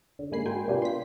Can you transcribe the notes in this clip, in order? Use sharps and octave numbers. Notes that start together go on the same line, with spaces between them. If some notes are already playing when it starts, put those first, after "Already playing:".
D3
G#2 G#3 A#3 G#5 B5 C7
F#4 A#4 G5 G#5 C6
C3 B3 D4 F4 G4
C6 B6